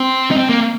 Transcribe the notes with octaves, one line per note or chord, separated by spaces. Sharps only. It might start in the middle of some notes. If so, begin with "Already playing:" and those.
Already playing: C4
D#4
C4
A#3